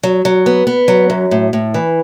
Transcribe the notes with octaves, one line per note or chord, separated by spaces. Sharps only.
F#3
F#3
B3
B3
F#3
F#2
A2
A2
E3